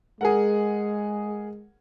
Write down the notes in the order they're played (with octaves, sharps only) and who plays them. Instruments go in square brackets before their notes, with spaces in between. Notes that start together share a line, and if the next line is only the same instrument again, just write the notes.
[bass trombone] G#3 [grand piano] G#4 A#4 F#5